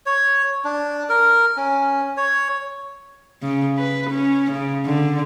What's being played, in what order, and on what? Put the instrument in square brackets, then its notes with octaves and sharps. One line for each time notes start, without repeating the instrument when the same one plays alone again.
[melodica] C#5
D4
A#4
C#4
C#5
[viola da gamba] C#3
B4
C#4
C#3
D3